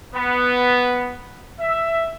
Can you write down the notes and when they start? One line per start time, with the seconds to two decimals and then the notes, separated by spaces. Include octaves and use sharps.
0.15 B3
1.60 E5